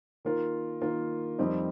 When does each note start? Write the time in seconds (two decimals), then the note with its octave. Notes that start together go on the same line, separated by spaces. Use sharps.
0.25 D#3 A#3 F4 A#4
0.82 D#3 A#3 F4 A#4
1.38 F2 D#3 G3 C4 D#4